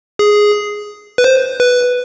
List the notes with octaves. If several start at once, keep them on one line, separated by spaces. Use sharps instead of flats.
G#4
B4
C5
B4